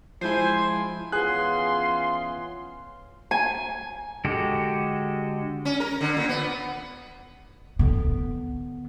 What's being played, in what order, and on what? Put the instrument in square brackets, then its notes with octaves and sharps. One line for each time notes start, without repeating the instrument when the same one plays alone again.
[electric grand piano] F3 G#3 E4 [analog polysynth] C5 [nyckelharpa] G#5
[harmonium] E3 B3 C#4 [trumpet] F4 [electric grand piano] G#4 F#6 [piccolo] C6
[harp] G#5
[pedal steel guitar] D3 G#3 F#4 G4 A4
[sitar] C#4
A#4
D3
A#2
B3
[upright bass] D3 B3